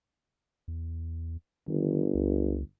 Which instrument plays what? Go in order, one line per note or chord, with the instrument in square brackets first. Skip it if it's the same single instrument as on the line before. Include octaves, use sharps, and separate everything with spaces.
[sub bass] E2
[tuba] G1 [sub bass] D#3
[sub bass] C#2